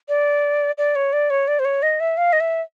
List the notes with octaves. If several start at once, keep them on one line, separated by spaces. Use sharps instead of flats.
D5
D5
C#5
D5
C#5
D5
C5
C#5
D#5
E5
F5
D#5
E5